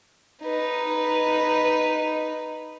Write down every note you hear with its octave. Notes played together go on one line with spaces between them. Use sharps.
D#4 B4